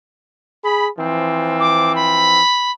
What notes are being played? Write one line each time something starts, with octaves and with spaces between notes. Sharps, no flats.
G#4 B5
E3 F3 C4
D6
B5